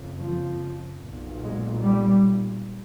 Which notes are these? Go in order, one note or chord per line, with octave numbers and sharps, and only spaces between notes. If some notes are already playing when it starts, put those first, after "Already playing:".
Already playing: F#1 F2 C#3
F3
B1 A#2
G#3
G3